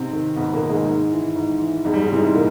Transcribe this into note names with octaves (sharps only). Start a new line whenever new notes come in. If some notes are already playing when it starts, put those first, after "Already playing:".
Already playing: G#2 C3 C4
D#3
G#2 B2 B3
A#2 A#3
D#3
G#2 G#3
G#2
E3
G#2
E3
E2 G#2 G#3
G3
G#2 G#3
C3 E3
G#2 G#3
A#2 A#3